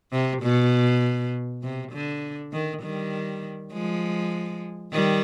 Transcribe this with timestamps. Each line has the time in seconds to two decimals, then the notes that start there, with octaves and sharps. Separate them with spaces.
0.12 C3
0.42 B2
1.63 C3
1.92 D3
2.53 D#3
2.83 D#3 G3
3.73 F3 G#3
4.93 D#3 G3